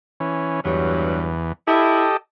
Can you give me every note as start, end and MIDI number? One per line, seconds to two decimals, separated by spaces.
0.20 0.60 52
0.20 0.60 61
0.65 1.53 40
0.65 1.30 43
0.65 1.30 54
1.67 2.07 64
1.67 2.17 67
1.67 2.17 69
1.67 2.17 75